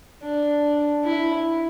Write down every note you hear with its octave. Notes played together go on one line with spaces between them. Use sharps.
D4
E4